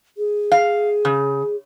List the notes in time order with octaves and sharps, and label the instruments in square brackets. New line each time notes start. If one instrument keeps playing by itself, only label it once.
[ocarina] G#4
[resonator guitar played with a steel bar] F5
C#3